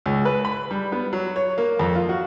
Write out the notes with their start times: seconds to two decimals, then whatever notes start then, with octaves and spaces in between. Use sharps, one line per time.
0.06 C#2
0.25 B4
0.45 B5
0.71 G3
0.92 B3
1.13 F#3
1.36 C#5
1.58 A#3
1.79 F2
1.96 F4
2.09 F#4